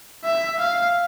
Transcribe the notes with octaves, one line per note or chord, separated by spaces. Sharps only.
E5
F5